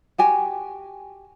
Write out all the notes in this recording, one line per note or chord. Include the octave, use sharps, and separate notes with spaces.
F#4 G4 G#5